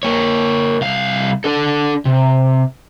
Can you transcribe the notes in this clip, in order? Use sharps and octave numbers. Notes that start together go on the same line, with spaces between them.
A#3 C#5
C2 F5
D4 A4
C3